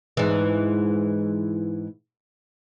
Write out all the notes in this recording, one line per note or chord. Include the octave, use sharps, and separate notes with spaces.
G#2 E3